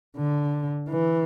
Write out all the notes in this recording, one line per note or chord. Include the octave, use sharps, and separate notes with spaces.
D3
E3